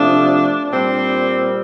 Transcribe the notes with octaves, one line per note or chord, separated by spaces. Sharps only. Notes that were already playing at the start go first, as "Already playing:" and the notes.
Already playing: C3 F3 A3 D4
A#2 G3 C4